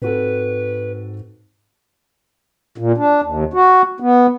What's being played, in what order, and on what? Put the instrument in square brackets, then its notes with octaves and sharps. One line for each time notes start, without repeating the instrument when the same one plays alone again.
[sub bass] G#2 [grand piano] C4 F#4 A4 [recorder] B4
[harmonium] A#2
D4
D#2
F#4
B3